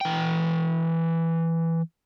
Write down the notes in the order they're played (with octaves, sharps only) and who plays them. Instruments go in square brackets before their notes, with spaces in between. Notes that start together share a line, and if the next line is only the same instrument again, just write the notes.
[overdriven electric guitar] E3 G5